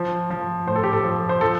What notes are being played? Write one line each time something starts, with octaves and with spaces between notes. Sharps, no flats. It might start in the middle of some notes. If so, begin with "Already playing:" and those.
Already playing: F3 C5
F3
A2 C5
A4
G4
A4
F3
C5
F3 A4